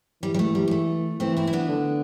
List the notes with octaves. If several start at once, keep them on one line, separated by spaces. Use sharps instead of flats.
E3 G3
G3
A3
G3
G3
A3
E3 A3 C4
C4 E4
E4
B3 D4
D3